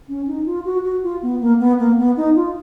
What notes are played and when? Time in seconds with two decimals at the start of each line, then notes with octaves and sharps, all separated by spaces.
0.09 C#4
0.27 D#4
0.46 F4
0.65 F#4
0.84 F#4
1.03 F4
1.23 B3
1.41 A#3
1.59 B3
1.79 A#3
1.98 B3
2.17 D#4
2.36 F4